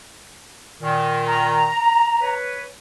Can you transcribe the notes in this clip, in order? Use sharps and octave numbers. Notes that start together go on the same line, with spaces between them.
A#2 D#3
A#5
B4 C#5